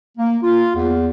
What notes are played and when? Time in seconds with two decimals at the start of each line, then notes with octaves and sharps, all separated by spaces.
0.18 A#3
0.43 F4
0.75 E2